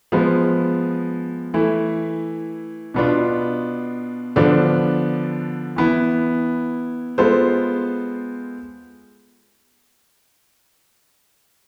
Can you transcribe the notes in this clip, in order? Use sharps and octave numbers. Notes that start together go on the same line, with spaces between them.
F3 G#3 B3
E3 A3 E4
B2 B3 D4 F4
D3 F3 B3 D4 A4
E3 B3 E4
G#3 B3 F4 A4 C5